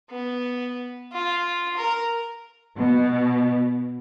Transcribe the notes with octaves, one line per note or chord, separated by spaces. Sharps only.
B3
F4
A#4
B2